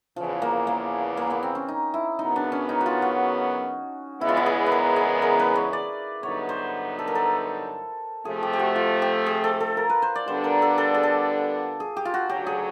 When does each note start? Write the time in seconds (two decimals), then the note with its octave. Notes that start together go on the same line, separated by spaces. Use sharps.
0.16 E2 C#3 E3 F3
0.42 A#3
0.67 A#3
1.17 A#3
1.30 B3
1.43 C4
1.55 C#4
1.68 D#4
1.94 E4
2.18 F#2 C#3 F#3 B3 D#4
2.36 D4
2.52 C#4
2.69 D#4
2.81 F#4
2.86 F4
3.02 F#4
4.20 E2 C#3 E3 G#3 B3 E4
4.29 F4
4.37 E4
4.46 G#4
4.66 B4
4.72 A#4
4.96 G#4
5.22 A#4
5.39 B4
5.55 C#5
5.73 D5
6.23 G2 D3 F#3 B3 D#4 C#5
6.49 C5
6.99 A4
7.08 A#4
7.15 A4
8.25 C3 F3 A3 G#4
8.43 G4
8.53 G4
8.59 F#4
8.76 F4
9.02 G4
9.26 G#4
9.44 A4
9.60 A4
9.77 A#4
9.90 B4
10.02 C5
10.15 D5
10.27 D3 G3 B3 D4 C5
10.44 A#4
10.62 A4
10.78 A4
10.94 G#4
11.03 A4
11.80 G#4
11.97 G4
12.05 F4
12.14 F#4
12.29 D2 C#3 F#3 G4
12.47 G#4